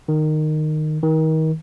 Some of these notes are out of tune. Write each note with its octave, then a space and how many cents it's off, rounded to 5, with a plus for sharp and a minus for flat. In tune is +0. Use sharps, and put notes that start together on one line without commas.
D#3 -15
D#3 +30